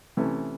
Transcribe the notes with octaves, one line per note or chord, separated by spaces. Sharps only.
C3 E3 A3 C#4